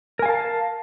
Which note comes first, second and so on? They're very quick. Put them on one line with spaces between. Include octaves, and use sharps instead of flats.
A#4 G#5 F5 A5